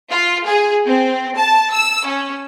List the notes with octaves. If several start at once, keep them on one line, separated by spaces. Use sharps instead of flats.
F4
G#4
C4
A5
E6
C#4